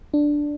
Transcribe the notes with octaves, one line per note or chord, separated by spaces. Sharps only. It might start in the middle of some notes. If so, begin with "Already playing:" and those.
D4